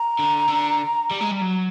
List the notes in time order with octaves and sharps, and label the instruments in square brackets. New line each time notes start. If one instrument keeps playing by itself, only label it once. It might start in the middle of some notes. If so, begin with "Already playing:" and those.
Already playing: [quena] A#5
[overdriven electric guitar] D3
D3
G3
G#3
G3
F#3